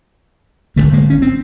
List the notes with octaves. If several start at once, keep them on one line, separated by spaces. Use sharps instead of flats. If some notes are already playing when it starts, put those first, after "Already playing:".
G#1 F#2 D3 G3 A3
G#3 A#3
C#4
C4